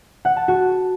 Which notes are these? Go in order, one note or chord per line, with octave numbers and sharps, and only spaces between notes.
F#5
A5
F#4